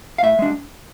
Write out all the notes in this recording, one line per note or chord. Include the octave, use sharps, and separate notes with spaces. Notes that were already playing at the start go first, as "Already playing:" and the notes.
F5
A2 E5
G#3 D4